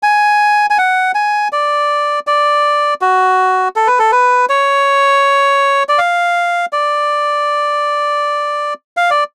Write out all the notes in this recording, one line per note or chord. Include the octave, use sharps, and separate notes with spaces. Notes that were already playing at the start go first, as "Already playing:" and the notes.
G#5
G#5
F#5
G#5
D5
D5
F#4
A4
B4
A4
B4
C#5
D5
F5
D5
F5
D5